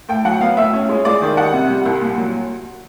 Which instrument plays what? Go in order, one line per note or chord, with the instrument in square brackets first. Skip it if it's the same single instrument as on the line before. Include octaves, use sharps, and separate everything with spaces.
[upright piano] A2 G5
F#3 F#5
B3 F5
A2 E5
C#4
G#3
G#3 D5
D#3
G3 F#5
C3
G3
C2
A#2
F#3